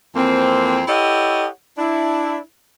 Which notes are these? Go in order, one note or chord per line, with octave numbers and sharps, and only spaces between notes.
F2 E3 A#3 C4
E4 G4 A4 C#5 D#5 F#5
D4 E4